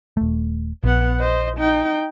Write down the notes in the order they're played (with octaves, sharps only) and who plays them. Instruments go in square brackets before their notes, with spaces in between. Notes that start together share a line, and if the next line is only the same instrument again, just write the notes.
[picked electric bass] D#1 A3
[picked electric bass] A#1 [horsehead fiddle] B3 F#5
[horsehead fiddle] C5 D#5
D#4 G5